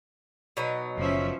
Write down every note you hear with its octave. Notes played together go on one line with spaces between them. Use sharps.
B2 F#3 D#4
F#1 F3 C#4 E5